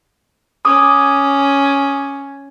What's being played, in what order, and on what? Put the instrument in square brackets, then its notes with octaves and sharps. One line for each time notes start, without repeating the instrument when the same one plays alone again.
[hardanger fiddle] C#4 [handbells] D6 D#6